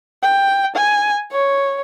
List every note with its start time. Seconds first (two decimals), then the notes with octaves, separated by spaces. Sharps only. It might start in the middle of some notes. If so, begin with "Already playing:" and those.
0.23 G5
0.76 G#5
1.32 C#5